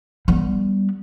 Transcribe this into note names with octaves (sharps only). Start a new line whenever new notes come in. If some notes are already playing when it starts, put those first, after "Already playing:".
G3 B3